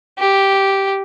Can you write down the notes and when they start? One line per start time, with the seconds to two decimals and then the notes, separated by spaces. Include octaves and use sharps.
0.19 G4